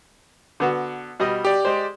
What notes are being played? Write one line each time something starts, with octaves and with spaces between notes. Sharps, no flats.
D3 B3 F#4
B2 G3 D#5
G4 D5
G#3 C5